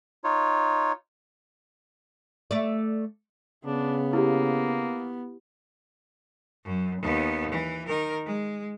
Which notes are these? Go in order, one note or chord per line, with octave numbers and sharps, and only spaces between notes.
D#4 F4 C#5
A3 D5
C#3 B3 D4
A#3 E4 G4
F#2
D#2 B3
E3
D#3 A#4
G#3